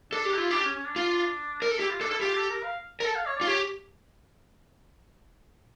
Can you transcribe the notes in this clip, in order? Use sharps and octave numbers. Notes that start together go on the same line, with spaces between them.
D4 A4
G4
E4 F4
D4 G4
C#4
C#4
D4
F4
A#4
A4
E4 G4
F4
D4 A4
E4 A4
F4 G4
A4
A#4
F5
A#4
A4 A5
F5
C#5
D5
F4
G4 C#5